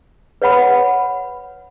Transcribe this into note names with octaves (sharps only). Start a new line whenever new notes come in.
B4 C#5 F#5 B5